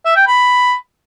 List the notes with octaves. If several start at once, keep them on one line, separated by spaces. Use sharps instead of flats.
E5
G5
B5